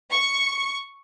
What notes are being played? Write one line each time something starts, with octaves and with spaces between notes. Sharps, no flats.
C#6